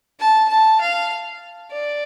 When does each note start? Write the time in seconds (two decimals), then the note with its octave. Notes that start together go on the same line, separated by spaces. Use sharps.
0.19 A5
0.49 A5
0.80 F5
1.71 D5